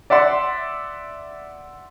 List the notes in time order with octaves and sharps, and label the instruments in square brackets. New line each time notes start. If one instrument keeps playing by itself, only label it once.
[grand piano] D5 E5 F#5 C6